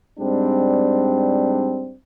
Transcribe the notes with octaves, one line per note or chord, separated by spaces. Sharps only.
G#2 G3 C4 D4